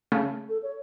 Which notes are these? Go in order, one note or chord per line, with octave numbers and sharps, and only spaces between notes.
C#3 A3
A4
C#5